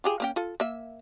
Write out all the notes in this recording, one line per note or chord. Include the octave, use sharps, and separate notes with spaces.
F4 G4 G#4
A#3 C#4 G5
F4 A4
A#3 E5